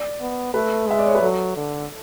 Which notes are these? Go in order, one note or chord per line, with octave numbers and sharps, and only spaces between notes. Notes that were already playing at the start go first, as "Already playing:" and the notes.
Already playing: D5
B3
A3 B4
G#3 E5
D5
C#5
B4
F#3 A4
D3